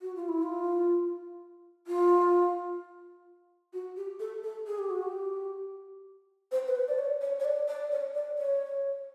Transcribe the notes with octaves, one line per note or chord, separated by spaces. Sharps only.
F#4
F4
E4
F4
F4
F#4
G4
A4
A4
G#4
G4
F#4
G4
C5
B4
C5
D5
C#5
C#5
C#5
D5
D5
C#5
D5
C#5